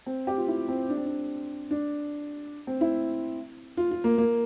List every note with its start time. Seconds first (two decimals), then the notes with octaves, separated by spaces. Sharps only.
0.06 C4
0.27 G4
0.38 F4
0.48 E4
0.68 C4
0.89 D4
0.97 C4
1.06 D4
1.71 D4
2.67 C4
2.81 E4
3.77 F4
3.91 F4
4.04 A#3
4.18 A#3